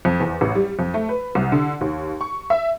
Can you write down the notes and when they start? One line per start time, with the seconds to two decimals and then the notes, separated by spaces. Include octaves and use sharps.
0.05 F2
0.20 E2
0.41 A1
0.55 G3
0.79 F2
0.94 A3
1.09 B4
1.35 C2
1.52 D3
1.81 D#2
2.21 C#6
2.50 E5